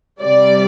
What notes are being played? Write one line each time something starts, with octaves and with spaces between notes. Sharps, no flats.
C3 G3 D5